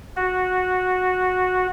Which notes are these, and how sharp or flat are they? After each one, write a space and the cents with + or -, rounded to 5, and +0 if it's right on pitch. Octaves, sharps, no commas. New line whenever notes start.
F#4 -10